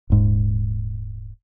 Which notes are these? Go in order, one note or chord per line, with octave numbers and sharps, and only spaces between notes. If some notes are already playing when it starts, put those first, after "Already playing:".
D#1 G#2